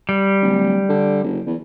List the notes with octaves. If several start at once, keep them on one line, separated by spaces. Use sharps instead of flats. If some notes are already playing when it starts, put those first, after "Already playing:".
G3
D1
D3
F#1
E2